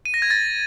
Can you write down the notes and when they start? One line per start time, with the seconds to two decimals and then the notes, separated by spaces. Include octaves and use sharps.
0.05 D#7
0.14 A#6
0.22 G#6
0.30 A6